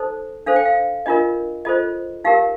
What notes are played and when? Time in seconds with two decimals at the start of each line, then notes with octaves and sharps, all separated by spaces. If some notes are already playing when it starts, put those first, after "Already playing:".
Already playing: D#4 A4 C5
0.46 D4 A4 C5 F5
0.56 G5
0.65 F5
1.06 D4 F4 A#4 D#5
1.65 F4 A4 C5 D#5
2.24 D#4 G4 A#4 F5